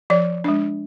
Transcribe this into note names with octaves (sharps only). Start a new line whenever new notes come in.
F3 D5
G#3 D4